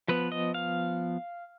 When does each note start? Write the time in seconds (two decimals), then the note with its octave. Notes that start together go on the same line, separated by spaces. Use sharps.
0.08 F3 B3 B4
0.32 D#5
0.54 F5